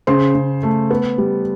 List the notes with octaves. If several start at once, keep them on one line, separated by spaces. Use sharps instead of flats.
C#3 C5 C6
C#3
A3
B3
G3